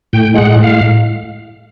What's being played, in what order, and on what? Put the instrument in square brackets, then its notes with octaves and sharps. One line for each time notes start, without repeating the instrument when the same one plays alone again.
[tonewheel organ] A2 G5
G#3 F#5
A2
F5